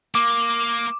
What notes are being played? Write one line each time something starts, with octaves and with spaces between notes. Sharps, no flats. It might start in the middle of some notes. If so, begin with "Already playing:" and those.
A#3 D6